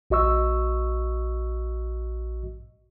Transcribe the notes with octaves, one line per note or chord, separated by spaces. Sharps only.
A#1 F#4 D#5 C#6 E6